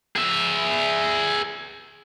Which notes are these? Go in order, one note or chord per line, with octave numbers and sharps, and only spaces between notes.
G#4 E5